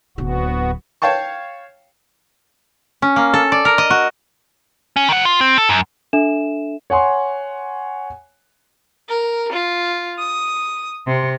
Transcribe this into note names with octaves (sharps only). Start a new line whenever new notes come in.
D1 D3 B3 F#4
C#5 F5 G5 A5 C#6
C#4
A#3
A4
D5
A#4
D#5
F#4
C#4
D#3 F#5
F4
C4
A4
F#2
D4 A4 E5 E7
C#5 F#5 G#5 C6
A#4
F4
D#6
C3